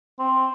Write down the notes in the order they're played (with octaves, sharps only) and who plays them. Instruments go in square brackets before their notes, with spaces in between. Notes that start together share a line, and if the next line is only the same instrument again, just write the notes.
[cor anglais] C4